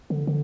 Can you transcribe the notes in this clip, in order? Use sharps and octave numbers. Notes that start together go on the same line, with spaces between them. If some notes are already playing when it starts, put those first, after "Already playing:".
D3
D3